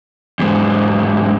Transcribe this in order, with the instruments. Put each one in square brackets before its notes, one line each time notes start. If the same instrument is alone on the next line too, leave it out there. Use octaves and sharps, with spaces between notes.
[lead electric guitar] E2 G#2